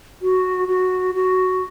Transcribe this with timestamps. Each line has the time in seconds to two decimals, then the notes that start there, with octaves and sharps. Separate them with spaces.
0.22 F#4
0.68 F#4
1.15 F#4